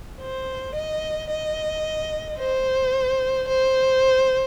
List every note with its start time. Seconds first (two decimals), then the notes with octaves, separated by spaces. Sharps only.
0.21 C5
0.76 D#5
1.30 D#5
2.39 C5
3.49 C5